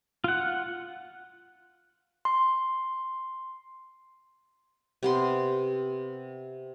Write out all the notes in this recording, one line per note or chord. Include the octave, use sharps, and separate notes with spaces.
F4 F#5
C6
C3 B3 C6